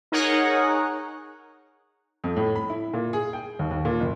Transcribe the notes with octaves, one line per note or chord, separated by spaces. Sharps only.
D#4 G#4 A#4 C#5 F#5
F2
A2
B5
E4
A#2
G#4
G5
D#2
D#2
A#2
F#1